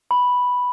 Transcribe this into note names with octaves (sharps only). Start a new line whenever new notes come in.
B5